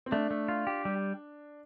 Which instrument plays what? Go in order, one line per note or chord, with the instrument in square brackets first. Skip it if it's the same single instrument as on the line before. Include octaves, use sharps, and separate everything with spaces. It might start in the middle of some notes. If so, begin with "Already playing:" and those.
[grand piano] C4
[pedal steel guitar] A3 [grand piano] D4
[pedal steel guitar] A3
F4
G4
G3